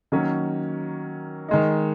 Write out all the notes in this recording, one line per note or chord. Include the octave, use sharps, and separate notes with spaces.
D#3 F#3 A#3 C#4
D#3 G#3 D#4